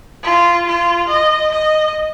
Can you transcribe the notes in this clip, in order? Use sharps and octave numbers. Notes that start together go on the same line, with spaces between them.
F4
F4
D#5
D#5